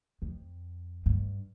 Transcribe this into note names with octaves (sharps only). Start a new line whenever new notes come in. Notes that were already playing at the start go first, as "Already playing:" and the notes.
F2
G2